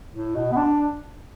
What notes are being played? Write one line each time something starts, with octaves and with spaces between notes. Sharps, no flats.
A2
B2
B3
D4